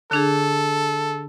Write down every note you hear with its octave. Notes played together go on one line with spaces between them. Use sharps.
D3 D4 G#4 A4